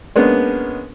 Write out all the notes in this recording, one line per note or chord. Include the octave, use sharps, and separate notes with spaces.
G#3 A#3 B3 C#4 D4